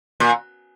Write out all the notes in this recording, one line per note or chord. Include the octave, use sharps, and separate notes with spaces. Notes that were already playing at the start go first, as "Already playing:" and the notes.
A#2